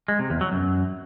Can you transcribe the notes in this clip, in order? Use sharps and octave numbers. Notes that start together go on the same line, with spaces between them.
G#3
C3
E2
F#3
F#2